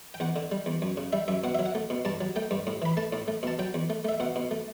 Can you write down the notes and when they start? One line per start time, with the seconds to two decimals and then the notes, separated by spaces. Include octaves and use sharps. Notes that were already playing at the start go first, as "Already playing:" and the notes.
0.14 G5
0.20 E2 F#5
0.36 D3
0.51 G3
0.66 E2
0.82 F#2
0.97 C#3
1.13 G3 E5
1.28 F#2 E5
1.44 B2 F#5
1.55 F#3 E5
1.65 F#5
1.75 A3
1.90 B2
2.05 G2 A5
2.21 F#3
2.36 A3 G5
2.51 G2
2.67 A2
2.82 E3 B5
2.97 A3 A5
3.13 A2
3.28 A3
3.43 B2 A5
3.59 F#3 G5
3.74 E2
3.90 A3
4.05 A3 E5
4.20 B2 F#5
4.36 B2
4.51 A3